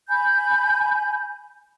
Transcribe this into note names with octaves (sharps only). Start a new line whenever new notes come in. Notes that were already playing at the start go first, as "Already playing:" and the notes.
G#5 B5 G6